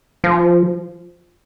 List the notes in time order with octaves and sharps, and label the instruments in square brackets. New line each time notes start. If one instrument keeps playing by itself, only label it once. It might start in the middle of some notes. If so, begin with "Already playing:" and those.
[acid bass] F3